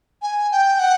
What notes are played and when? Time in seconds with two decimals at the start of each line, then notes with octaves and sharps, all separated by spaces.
0.22 G#5
0.52 G5
0.80 F#5